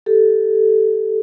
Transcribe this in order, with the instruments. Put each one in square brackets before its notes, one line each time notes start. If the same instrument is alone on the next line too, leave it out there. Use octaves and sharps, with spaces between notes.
[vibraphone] G4 A4